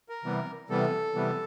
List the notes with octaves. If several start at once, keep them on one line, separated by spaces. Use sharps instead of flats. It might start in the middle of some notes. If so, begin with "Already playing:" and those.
A#4
C3 E3 G3 B3
C3 E3 G3 B3 A4
C3 E3 G3 B3